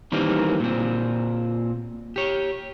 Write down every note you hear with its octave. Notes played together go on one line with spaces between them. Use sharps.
D#3 E3 G3 A#3 C4
A#2 C4
G4 C#5